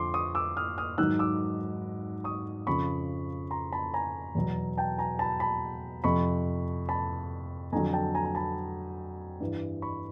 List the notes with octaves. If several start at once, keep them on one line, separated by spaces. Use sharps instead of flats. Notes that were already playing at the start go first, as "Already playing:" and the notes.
Already playing: F2 D3 F3 C6 D6
C#6 D#6
D6 E6
D#6 F6
D#6 F6
G#2 D#3 F#3 E6 F#6
D6 E6
C#6 D#6
F2 C#3 F3 B5 C#6
A#5 C6
A5 B5
G#5 A#5
E2 B2 F#3
G5 A5
G#5 A#5
A5 B5
A5 B5
F2 C3 F3 B5 C#6
A5 B5
F2 D3 F#3 G#5 A#5
G5 A5
G#5 A#5
A#5
A5 B5
G2 E3
B5 C#6